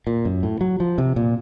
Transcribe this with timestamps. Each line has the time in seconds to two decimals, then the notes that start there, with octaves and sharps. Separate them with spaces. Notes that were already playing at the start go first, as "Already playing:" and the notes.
0.07 A#2
0.25 F#2
0.43 A2
0.61 F#3
0.80 F3
0.98 C3
1.16 A#2